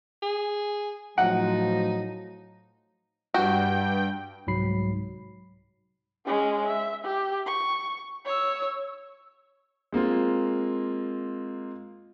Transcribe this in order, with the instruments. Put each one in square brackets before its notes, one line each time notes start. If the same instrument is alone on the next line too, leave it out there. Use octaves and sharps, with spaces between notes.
[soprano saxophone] G#4
[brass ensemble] A2 F3 F#3 [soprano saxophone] D#4 [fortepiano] F#5
[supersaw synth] G2 G5 [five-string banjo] F#4
[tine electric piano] C2 G#2 F#3 B5 C7
[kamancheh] G#3 C#4
E5
G4
C#6
C#5 E6
[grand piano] G#3 A#3 C4 F4